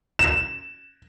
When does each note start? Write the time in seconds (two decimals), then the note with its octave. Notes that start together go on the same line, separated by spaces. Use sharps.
0.19 E7